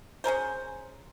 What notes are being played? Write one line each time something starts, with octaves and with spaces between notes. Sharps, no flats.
C#4 G#4 A#4 C5